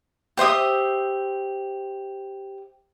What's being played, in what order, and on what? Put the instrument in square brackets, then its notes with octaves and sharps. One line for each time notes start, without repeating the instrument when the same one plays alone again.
[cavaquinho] G4 C5 E5 D#6